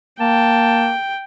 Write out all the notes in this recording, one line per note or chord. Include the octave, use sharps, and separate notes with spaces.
A#3 G5 A5